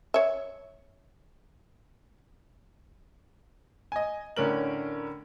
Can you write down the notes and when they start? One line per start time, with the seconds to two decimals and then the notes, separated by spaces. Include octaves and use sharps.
0.14 C#5 E5
3.92 D#5 G#5
4.37 A2 D3 C#4 A#4 F#7